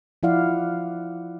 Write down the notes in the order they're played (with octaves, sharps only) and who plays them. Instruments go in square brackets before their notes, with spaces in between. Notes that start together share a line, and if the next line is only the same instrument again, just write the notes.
[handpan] F3 E4 D5 F5 F#5